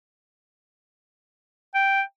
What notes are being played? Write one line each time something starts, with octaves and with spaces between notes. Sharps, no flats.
G5